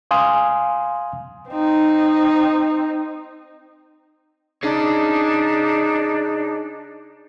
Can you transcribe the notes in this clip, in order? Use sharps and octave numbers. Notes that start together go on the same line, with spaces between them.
F5 G#5 C6 D#6
C4 D#4
D4 D#4 G#4 C#5